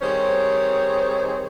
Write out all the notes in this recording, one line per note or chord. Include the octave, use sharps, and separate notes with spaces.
D#3 G3 C4 G#4 C5 C#5